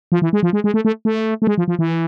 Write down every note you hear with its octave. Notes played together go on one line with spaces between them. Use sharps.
F3
E3
G#3
F3
G#3
G#3
A3
A3
A3
A3
G#3
F3
F3
E3